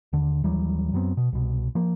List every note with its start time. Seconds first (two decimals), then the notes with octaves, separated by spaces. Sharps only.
0.13 D#2 D3
0.44 D#2 E3 F#3 G3
0.93 F#2 F#3 B3 C4
1.17 B2
1.32 C2 B2
1.75 F3 A#3